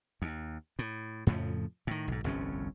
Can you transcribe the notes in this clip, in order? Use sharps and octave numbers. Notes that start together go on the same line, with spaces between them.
D#2
A2
F2 A2 C#3 F3
A2 D#3
B1 G#2
G1 C2 F2 C#4